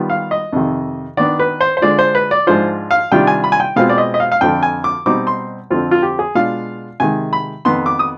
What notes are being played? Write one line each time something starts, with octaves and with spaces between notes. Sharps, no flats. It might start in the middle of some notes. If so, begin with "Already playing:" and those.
Already playing: D#3 G3 B3 F4
F5
D#5
F2 C3 D#3
D#3 B3 D4 D5
B4
C5
C5
D3 G#3 D4 F4 D5
C5
B4
D5
G#2 F3 G#3 D4 F4 C5
F5
C3 D#3 G3 D4 F4 G5
G#5
B5
G#5
G5
B2 G#3 C4 F4 F5
D5
D#5
D#5
F5
F5
F2 D3 F3 G5
G#5
D6
B2 G3 C4 D#4 D6
C6
F2 D3 F3 C4 F4
F4
G4
G#4
B2 G#3 D4 F4 F5
C3 D#3 G#3 G#5
B5
F2 D#3 B3 C6
D6
D#6